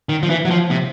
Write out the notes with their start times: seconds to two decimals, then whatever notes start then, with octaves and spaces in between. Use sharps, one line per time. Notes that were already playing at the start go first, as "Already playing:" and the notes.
0.09 D#3
0.23 F3
0.30 E3
0.45 F#3
0.50 F3
0.71 C3